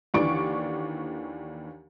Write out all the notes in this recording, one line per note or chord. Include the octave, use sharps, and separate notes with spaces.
D#2 D3 E3 D5 C#6 D7